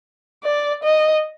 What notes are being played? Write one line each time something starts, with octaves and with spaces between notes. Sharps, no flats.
D5
D#5